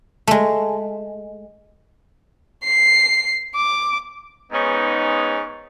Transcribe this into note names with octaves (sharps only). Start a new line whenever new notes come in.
G#3 A3
C7
D6
G#2 G#3 B3 C#4 D#4